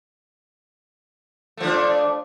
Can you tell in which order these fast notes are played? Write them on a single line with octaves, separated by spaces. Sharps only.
A3 F3 D4